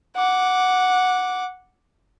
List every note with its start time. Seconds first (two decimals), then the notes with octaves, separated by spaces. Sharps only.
0.16 F#5 D6